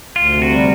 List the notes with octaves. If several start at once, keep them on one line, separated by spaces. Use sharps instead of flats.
D2 F4
C3
F#4
G3